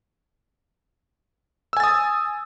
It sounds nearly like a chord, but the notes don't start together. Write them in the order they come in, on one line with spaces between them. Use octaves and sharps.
E6 G#5 A6 D#6